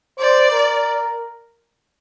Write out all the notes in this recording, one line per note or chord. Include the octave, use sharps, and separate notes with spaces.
C5 D5
A#4